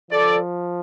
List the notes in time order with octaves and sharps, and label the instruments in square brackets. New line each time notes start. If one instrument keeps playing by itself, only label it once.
[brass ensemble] F3 A4 D5